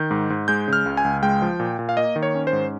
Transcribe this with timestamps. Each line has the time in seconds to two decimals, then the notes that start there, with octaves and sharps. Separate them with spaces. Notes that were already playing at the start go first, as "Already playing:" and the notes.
Already playing: D#3 G6
0.11 G#2
0.30 G#2
0.48 G#3 G6
0.68 C#3
0.73 F6
0.86 C#2
0.97 G#5
1.04 C#2
1.23 G#3 G5
1.42 F3
1.60 A#2
1.79 A#2
1.89 F5
1.97 A#3 D#5
2.16 D#3
2.23 C#5
2.35 C#4
2.47 C5
2.53 G#2